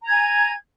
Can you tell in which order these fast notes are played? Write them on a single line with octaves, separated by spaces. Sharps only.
A#5 G#6 G#5